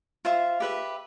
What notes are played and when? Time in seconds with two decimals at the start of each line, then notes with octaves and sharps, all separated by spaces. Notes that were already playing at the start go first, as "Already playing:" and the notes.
0.25 F4 C5 E5
0.60 G4 B4 E5